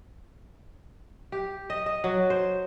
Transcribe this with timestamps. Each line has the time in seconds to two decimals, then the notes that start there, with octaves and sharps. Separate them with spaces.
1.32 G4
1.70 D#5
1.86 D#5
2.04 F#3
2.30 C5